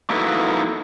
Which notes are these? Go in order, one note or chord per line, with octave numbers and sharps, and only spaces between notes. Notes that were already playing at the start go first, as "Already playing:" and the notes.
A#3 D#4 E4 F#4 A4 B4